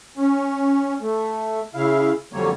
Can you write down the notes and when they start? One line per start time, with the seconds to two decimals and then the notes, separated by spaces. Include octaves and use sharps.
0.17 C#4
1.01 A3
1.75 C#3 E4 F5
2.33 F2 D3 F#3 G3 A#3 C#5